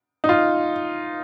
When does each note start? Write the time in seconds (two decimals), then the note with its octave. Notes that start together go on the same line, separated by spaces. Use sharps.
0.24 D#4
0.29 F4